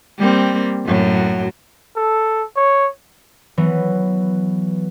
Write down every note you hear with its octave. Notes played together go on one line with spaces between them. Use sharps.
G3 A#3 C4
F#2 A2 F#3
A4
C#5
E3 F#3 B3